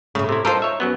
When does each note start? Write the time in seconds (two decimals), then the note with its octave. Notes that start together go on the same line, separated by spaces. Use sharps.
0.15 A2 C#3 A3
0.29 C3 E4
0.45 D#4 F4 A4 A#4 C5
0.62 C#5 E5
0.80 F#2 F#3 B3